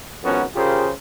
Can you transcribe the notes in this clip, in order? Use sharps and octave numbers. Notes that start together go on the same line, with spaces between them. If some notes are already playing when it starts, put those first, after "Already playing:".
G#1 F2 B3 C#4 F#4 A#4
C#3 F4 G4 G#4 A#4 C5